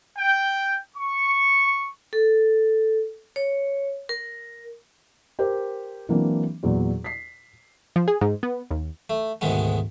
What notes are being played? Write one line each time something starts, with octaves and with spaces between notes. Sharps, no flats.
G5
C#6
A4
C#5
A#4
G4 A#4 C5
E3 F#3 A#3 C4 D4
E2 A#2 F#3
B6 C7
F3
G#4
G#2
B3
D#2
A3
D2 G#2 B2 D#3 G#3 B3